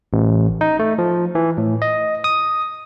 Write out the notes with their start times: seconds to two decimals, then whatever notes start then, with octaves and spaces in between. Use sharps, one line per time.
0.13 A1
0.61 D#4
0.79 A3
0.98 F3
1.35 E3
1.58 A2
1.82 D#5
2.24 D#6